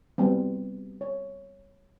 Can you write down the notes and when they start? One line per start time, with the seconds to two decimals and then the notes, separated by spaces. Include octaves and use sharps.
0.18 G3 B3 C4
1.01 C#5